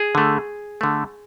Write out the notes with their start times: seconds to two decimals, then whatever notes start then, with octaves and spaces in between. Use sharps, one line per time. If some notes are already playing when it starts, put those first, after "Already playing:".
Already playing: G#4
0.15 D3 A3
0.81 D3 A3